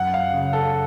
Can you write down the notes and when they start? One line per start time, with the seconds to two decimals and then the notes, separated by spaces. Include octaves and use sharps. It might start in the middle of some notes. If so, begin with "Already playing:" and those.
Already playing: F#2 F#5
0.14 F5
0.34 C#3
0.53 A4